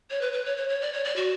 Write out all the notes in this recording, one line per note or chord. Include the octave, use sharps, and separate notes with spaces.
C#5
B4
B4
C#5
C#5
C#5
D5
C#5
D5
F#4